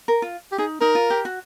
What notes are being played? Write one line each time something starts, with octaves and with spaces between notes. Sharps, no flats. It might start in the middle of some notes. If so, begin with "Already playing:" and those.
A#4
F4
G4
D#4 G#4
D#4 A#4
F4
G4
F#4